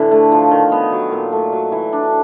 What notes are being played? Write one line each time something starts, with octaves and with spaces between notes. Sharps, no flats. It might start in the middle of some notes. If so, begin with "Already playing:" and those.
Already playing: A2 D3 E3
A3
F3
D#3
B3
F#3
A#2
A3
F#3
E3
D4